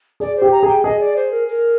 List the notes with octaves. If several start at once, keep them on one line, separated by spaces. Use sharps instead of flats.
G#4 D5
C5
G4
A#5
G#4 G5
G#4 D#5
D5
C5
A#4
A#4